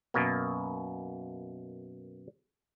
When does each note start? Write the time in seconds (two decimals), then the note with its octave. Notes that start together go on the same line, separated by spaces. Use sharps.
0.14 F#2 B2 A#3